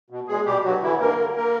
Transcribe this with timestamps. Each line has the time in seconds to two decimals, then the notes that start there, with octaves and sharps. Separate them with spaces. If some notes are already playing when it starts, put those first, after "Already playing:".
0.10 B2
0.27 E2 G#3 G#4
0.45 B2 G3 G4
0.63 G2 F#3 F#4
0.82 D3 E3 E4
0.99 G2 A#3 A#4
1.18 D3
1.36 A#3 A#4